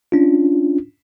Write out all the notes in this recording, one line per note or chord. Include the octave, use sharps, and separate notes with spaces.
C#4 D4 F4